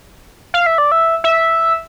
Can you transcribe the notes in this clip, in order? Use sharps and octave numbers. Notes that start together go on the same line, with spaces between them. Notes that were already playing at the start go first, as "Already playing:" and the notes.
F5
E5
D5
E5
E5